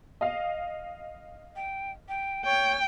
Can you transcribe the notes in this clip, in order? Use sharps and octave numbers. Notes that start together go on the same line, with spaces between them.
D#5 F5
G5
G5
C#5 G5